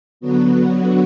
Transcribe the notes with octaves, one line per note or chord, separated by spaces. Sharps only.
D3 F#3 B3 F#4